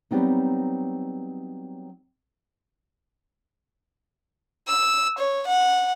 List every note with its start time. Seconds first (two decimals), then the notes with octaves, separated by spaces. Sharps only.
0.11 F#3 G3 B3 C4 D#4
4.68 E6
5.19 C#5
5.48 F#5